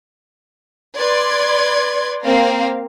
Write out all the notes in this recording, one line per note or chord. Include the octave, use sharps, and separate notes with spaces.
B4 D5 C6 G#6
A#3 C4 A#4 F5